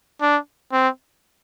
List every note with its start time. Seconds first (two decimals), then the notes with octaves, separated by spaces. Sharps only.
0.22 D4
0.73 C4